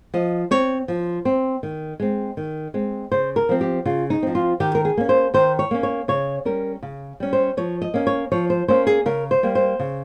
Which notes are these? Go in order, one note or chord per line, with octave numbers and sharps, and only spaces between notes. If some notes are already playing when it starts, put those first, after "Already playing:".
F3 D#5
C4 C#5
F3
C4
D#3
G#3 C4
D#3
G#3 C4
C#3 C5
A#4
F3 C4
G4
C#3 F4
D#4
F3 C4
F4
D#3 G4
A#4
G#4
A#3 C#4
C5
D#3 C5
C#5
A#3 C#4
C#5
C#3 C#5
G3 C#4 A#4
C#3
G3 C#4
C5
F3 C#5
D#5
A#3 C#4
C#5
F3 C#5
C5
A#3 C#4 C5
G#4
C#3 A#4
C5
G3 A#3
C5
C#3